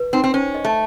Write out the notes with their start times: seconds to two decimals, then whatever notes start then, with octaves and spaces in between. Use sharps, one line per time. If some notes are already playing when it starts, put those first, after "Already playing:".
Already playing: B4
0.13 C4 D#4
0.24 C4
0.34 C#4 C5
0.55 D#5
0.65 A3